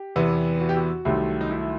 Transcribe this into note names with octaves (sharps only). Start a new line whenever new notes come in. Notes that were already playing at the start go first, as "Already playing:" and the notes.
Already playing: G4
E2 C3 E3 B3
F#4
G4
F#4
C2 C3 D#3 F#3 A3
D#4
E4